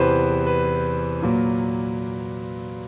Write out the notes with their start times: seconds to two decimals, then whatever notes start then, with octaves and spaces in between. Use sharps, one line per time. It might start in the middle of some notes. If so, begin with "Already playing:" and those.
Already playing: E2 C3 E3 B4 C5
0.46 B4
1.22 A#2 F#3 A#3